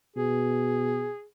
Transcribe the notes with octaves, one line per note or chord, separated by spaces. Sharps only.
B2 G#4